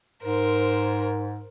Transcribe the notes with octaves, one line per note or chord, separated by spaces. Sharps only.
G#2 A#4 C5